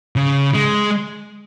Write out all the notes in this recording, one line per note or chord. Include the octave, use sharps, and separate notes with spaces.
C#3
G#3